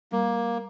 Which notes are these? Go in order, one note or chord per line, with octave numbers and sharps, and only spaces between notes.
G3 A#3